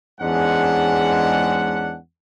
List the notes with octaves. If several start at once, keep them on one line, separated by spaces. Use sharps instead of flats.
E2 G#2 G#3 C#4 D4 F#5